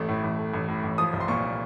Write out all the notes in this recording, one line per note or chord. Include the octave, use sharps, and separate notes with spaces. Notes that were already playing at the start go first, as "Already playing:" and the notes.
Already playing: A1 A3
A2
A1
A3
A1
A2
A1
F3 D#6
C2
C6
A#2 C#6